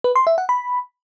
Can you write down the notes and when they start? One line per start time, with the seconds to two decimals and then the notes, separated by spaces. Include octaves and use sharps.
0.04 B4
0.16 C6
0.27 E5
0.38 F#5
0.49 B5